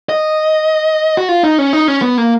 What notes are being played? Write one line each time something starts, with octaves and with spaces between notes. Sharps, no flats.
D#5
F#4
F4
D#4
C#4
D#4
C#4
B3
A#3